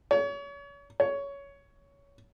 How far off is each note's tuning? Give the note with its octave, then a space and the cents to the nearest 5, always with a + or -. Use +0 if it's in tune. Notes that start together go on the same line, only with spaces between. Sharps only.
C#5 +35
C#5 +15